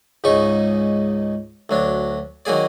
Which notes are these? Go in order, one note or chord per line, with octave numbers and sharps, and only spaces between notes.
C#2 G#2 C#3 D#4 C#6
D2 F#3 D4
D#3 F#3 A#3 G#4 D5